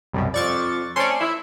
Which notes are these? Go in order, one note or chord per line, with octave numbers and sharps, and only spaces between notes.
C2 F#2 B2
F2 D5 C#6 A6
A3 C4 C#4 D5 C6
E4